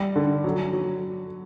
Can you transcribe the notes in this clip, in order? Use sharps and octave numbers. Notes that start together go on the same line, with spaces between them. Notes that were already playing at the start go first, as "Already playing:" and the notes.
Already playing: G3
D3
F#3
F#3